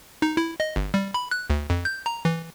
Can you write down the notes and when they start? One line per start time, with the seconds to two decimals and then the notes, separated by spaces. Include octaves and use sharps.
0.22 D#4
0.37 E4
0.60 D#5
0.76 G1
0.94 G3
1.14 B5
1.31 F#6
1.50 D2
1.70 F2
1.85 G6
2.06 A#5
2.25 E3